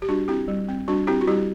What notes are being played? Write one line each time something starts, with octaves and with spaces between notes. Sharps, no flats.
G4
G3 D4 F#4
C4 E4 G4
G3
C4
G3 D4 F#4
C4 E4 G4
F#4
G3 E4 G4